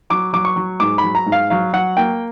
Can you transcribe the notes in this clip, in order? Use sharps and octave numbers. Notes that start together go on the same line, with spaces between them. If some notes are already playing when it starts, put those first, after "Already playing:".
F#3 D6
F#3 D6
C#6
F#3
G#2 D6
F#3 B5
A#5
G#2
F5
F#3 F5
F#3 F#5
A#3 G5